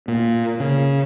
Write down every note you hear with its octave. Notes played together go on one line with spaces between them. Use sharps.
A#2
C#3